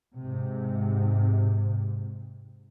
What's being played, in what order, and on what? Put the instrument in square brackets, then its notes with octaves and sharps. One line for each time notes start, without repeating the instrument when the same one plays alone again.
[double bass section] G#2 C3